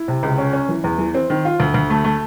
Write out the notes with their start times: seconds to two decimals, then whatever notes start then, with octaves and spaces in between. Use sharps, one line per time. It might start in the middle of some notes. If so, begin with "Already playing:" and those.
Already playing: E4
0.08 C3
0.23 C#2
0.38 C#4
0.53 C#4
0.69 E3
0.84 E2
0.99 E3
1.14 C4
1.30 D#3
1.45 F4
1.60 D2
1.74 D2
1.90 A3
2.04 A3